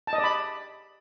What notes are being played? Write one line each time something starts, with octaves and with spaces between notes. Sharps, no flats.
A5
D#5
D5
B5